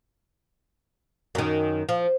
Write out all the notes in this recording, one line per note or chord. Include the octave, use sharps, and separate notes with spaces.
F#2 D#3
F3